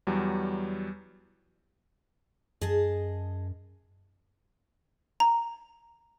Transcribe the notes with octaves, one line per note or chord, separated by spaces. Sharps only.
E2 F#3 G3
F#2 G#4 D#5 A5
A#5